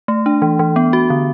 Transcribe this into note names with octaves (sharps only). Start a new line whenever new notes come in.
A3
D4
E3
E3
B3
F#4
D3